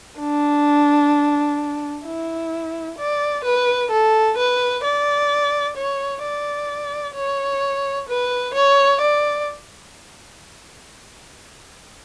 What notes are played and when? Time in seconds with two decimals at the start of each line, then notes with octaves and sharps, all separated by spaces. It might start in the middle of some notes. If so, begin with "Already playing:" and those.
0.20 D4
2.05 E4
2.98 D5
3.45 B4
3.91 A4
4.37 B4
4.84 D5
5.76 C#5
6.23 D5
7.15 C#5
8.09 B4
8.54 C#5
9.01 D5